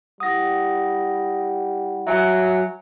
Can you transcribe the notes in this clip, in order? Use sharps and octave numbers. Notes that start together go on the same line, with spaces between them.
G3 E4 F#5 D#6 A#6
F#3 E5 G#5